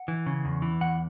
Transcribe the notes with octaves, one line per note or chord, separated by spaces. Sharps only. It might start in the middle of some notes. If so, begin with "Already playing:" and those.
Already playing: F#5
E3
C#3
E2
E3
E2 F#5